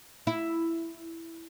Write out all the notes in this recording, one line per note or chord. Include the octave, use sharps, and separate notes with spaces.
E4